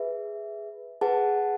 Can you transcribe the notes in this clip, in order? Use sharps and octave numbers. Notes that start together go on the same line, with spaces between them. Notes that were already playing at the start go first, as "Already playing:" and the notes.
Already playing: G#4 B4 E5
G#4 B4 F#5 A5